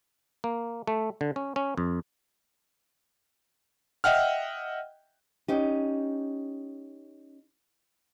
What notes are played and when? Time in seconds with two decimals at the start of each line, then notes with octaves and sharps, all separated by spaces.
0.44 A#3
0.87 A3
1.21 D3
1.36 C#4
1.56 C#4
1.78 F2
4.04 D#5 E5 F#5 G5 F6
5.48 C#4 D#4 G4